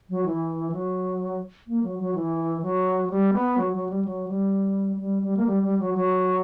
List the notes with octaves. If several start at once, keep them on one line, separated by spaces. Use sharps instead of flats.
F#3
E3
F#3
A#3
F#3
F#3
E3
F#3
G3
B3
F#3
F#3
G3
F#3
G3
G3
G3
A#3
G3
G3
F#3
F#3